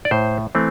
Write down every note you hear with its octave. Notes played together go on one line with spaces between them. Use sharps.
D5
A2 C5
E3 A3 C4